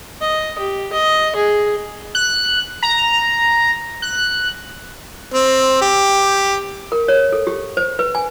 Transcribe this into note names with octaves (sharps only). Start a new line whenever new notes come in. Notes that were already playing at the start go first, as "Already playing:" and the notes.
D#5
G4
D#5
G#4
F#6
A#5
F#6
C4
G4
A#4
C#5
A4
G4
C5
B4
G#5